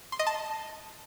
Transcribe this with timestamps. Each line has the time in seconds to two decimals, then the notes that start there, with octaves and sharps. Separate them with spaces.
0.12 C6
0.19 D#5
0.27 A5